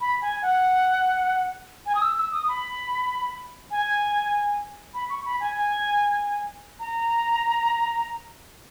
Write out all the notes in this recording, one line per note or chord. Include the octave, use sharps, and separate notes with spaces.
B5
G#5
F#5
G#5
D#6
E6
E6
D#6
B5
G#5
B5
C#6
B5
G#5
G#5
A#5